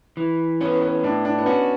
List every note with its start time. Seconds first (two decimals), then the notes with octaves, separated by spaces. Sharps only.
0.17 E3
0.61 B3 C#4
0.82 B3
1.03 A2 D4
1.25 D4
1.38 B3
1.46 C#4 F#4